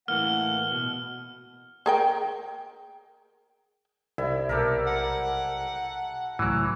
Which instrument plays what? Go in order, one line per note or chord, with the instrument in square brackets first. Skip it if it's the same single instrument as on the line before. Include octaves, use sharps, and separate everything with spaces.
[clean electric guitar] A2 E3 A#3 [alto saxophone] F#5 [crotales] F6 G7
[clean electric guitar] B2
[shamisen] G#4 A#4 G5
[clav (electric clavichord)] C2 [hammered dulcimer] E4
[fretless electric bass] B1 [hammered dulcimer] G4 A4 A#4
[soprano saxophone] F#5
[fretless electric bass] C#2 A2 [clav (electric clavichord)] E3 F#3